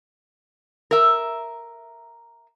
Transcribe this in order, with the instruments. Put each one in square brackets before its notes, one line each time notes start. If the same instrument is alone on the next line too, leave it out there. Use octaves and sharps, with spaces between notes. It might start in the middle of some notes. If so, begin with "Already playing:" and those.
[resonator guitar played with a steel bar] A#4 E5